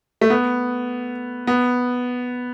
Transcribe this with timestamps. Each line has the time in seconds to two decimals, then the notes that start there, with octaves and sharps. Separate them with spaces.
0.21 A3
0.30 B3
1.47 B3